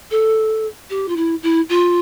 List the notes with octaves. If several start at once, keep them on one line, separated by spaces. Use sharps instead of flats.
A4
G4
F4
E4
E4
F4